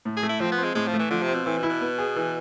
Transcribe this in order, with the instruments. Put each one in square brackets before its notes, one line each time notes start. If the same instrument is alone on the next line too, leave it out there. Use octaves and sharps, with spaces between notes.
[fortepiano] A2
[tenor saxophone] G#4
[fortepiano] A3
[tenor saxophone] E4
[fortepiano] F3 [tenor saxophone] C4
[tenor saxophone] B3
[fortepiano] C4
[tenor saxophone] G#3
[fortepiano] A2 [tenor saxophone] G#3
[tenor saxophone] F3
[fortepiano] A3
[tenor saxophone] E3
[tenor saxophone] D3 [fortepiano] F3
[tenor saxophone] C3
[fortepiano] C4
[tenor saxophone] B2
[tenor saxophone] A2 [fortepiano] E3
[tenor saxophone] B2
[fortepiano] E4
[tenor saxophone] B2
[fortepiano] B3
G#4
E3